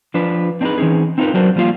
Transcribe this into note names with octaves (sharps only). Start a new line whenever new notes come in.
F3 D4 F4 B4
C4 D4 D#4 F4 G#4 B4
E3 C4 C#4 D#4 G#4
C4 D#4 F4 F#4 A#4 B4
F#3 D4 F#4 A#4 C5
F3 G3 A#3 F4 F5